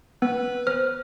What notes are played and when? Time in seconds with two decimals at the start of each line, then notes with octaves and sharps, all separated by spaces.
0.22 B3 B4
0.67 C5 F6